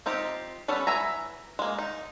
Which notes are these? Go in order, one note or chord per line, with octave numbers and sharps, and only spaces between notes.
C4 D#4 F4 G4
G3 B3 C#4 A4 B4
E3 E5 G#5 A#5
G#3 A#3
D#4